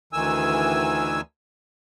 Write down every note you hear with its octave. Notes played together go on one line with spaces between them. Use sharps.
D2 D#3 E3 G#5 E6